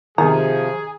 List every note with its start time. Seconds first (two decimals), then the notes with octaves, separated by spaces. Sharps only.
0.18 C3 D#3 F3 G#4 A#5